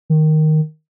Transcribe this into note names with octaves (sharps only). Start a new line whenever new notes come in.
D#3